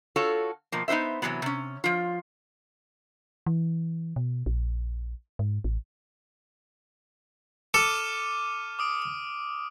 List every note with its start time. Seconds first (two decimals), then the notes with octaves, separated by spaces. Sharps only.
0.16 F4 F#4 A4 C#5
0.72 B2 F3 A#3
0.88 B3 D#4 F4 C5 E5
1.22 C3 D#3 E3 F#3 B3
1.42 C3 C#4
1.84 F3 F4
3.47 E3
4.16 B2
4.46 A#1
5.39 G#2
5.64 A1
7.74 A4 D6 F6 D#7
8.79 D6 D#6 D7